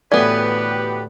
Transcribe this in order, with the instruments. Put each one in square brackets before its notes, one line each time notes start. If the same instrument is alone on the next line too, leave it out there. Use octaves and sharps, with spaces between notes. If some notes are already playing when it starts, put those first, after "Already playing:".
[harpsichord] D2 A2 [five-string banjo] E3 B3 [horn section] G4 B4 [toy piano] D5